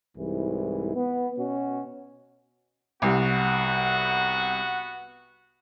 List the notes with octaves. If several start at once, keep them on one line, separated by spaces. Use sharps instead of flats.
C2 G#2 E3
B3
B2 C#4 F#4
C2 B3 F#4